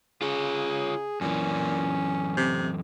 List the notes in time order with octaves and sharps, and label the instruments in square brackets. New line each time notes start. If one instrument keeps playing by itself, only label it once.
[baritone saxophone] C#3 [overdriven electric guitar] F4 C#5 [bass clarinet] G#4
[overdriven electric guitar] F#2 E3 [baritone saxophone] A#2 [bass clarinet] C#4
[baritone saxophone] C3